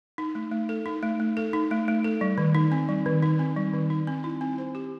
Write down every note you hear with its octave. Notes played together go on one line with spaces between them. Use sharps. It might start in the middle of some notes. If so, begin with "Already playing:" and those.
D#4
A3
A3
A4
D#4
A3
A3
A4
D#4
A3
A3
A4
G3
D#3
D#4
C4
G3
D#3
D#4
C4
G3
D#3
D#4
C4
E4
C4
C5
G4